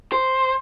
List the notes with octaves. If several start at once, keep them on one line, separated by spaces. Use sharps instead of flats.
C5